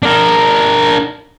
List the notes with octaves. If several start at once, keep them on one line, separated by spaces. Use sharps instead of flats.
D4 A#4